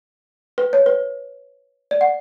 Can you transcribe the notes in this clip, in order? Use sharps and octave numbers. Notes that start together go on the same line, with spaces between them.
B4
C#5
B4
D5
F#5